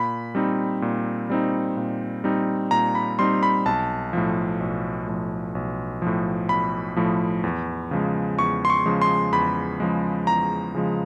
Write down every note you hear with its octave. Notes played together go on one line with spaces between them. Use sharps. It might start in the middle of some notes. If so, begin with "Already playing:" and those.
Already playing: A#2 B5
G3 C4 D#4
A#2
G3 C4 D#4
A#2
G3 C4 D#4
A#2 A#5
B5
G3 C4 D#4 C6
B5
B1 A5
A2 F3
B1
A2 F3
B1
A2 F3
B1 B5
A2 F3
E2
C#3 F3 G#3
E2 C#6
C6
C#6
C#3 F3 G#3
C6
E2 B5
C#3 F3 G#3
E2 A#5
C#3 F3 G#3